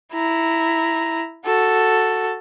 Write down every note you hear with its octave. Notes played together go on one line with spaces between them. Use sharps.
E4 A#5
F#4 A4